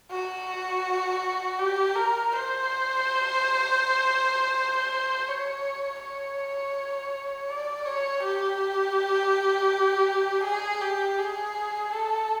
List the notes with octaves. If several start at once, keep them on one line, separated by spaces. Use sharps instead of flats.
F#4
G4
A#4
C5
C#5
C#5
D5
C#5
G4
G#4
G4
G#4
A4